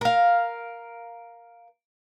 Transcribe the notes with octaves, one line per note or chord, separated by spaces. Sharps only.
A#4 F5